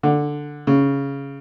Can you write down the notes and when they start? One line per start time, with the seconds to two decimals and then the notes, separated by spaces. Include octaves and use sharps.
0.03 D3
0.67 C#3